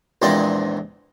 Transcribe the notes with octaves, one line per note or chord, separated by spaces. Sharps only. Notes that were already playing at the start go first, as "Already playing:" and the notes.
A#1 E2 G#3 C4 D#4 D5